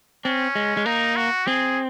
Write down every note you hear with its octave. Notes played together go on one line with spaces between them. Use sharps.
C4 C#4
G#3
G#3
A#3 D#4
F#4
C4 G#4